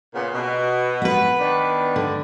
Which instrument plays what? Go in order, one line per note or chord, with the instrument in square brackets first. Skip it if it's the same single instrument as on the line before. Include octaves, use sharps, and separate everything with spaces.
[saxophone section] A#2 C#3 B3
B2
[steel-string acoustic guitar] B3 B4
[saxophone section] D#3 D4
[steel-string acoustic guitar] D3